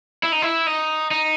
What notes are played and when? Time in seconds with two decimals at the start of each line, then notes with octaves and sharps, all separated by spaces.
0.23 E4
0.32 D#4
0.42 E4
0.67 D#4
1.11 D#4